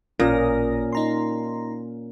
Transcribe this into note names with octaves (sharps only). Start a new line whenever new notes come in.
A1 A#2 C#4 A#4 D#6 A#6
D#4 A#5 C6